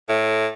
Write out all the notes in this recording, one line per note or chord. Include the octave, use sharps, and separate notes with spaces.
A2